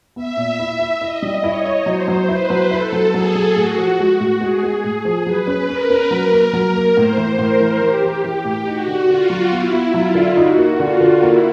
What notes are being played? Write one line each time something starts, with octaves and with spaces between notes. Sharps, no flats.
B3 E5
A#2
E4
E4
E4 D#5
G3
E4 C#5
E4
F#3 C5
F#3
E4 B4
F#3
E4 A4
F#3
F#3 G#4
F#3
A2 F#4
F3
G#3
A2
G#3 G#4
G#3
A2 G#4
F3
F#3 B4
C#4
C#4 A#4
C#4
F#3
A#3
F#3
A#3
A2 C5
E3
A2 A#4
E3
E3 G4
E3
E3
A2
D#4 F#4
D3
D3 F4
F#3
B3 E4
B3
F#3 F4
D3
D#4 F#4
A#3
D3 F4
D3
A#3 E4